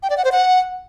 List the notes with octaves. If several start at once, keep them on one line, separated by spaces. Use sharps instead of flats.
G5
D5
F#5
C5
F#5